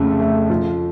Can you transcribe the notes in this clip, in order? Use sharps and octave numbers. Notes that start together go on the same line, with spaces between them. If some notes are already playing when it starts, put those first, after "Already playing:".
Already playing: F2 C#3 A3
A3
F3